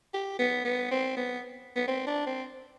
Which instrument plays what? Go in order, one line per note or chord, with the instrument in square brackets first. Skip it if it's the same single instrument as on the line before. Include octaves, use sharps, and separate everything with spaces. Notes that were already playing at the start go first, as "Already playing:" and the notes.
[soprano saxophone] G4
B3
B3
C4
B3
B3
C4
D4
C4